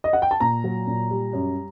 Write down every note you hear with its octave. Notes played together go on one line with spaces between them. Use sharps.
D#5
F#5
G5
A5
A#2 A#5
F#3
A#2
G3
F#2